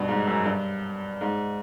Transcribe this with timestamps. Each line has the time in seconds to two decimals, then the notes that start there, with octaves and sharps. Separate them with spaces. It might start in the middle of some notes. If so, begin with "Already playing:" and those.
Already playing: G2 B2
0.08 G#2
0.27 F#2
0.46 G2
1.21 G#2